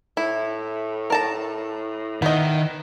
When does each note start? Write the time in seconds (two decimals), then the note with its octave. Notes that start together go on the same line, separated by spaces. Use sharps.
0.17 A2 E4
1.10 A#4 A5 A#5
2.22 D#3 B3 E4 D#5